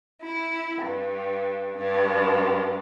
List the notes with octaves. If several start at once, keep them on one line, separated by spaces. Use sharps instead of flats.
E4
G2
G2